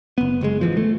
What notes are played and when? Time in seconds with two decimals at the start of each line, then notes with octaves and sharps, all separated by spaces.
0.18 F#1 B3
0.41 F#1 A#2 G#3
0.61 A1 E3 F3
0.77 A3